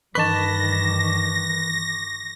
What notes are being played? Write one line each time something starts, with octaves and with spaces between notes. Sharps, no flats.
G2 D#3 E3 B4 A5 C#6 D6 A#6